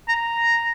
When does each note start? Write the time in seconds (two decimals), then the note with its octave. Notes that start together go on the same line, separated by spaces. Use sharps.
0.09 A#5